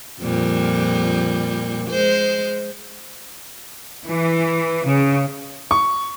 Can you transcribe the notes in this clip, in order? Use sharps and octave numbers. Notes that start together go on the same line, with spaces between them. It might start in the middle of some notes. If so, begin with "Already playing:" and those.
F2 A#2 G3
G#3 C5
E3
C#3
C#6